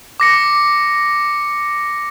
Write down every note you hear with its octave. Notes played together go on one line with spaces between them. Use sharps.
D6 A#6 C#7